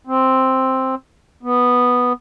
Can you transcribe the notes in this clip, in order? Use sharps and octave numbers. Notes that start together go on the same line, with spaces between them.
C4
B3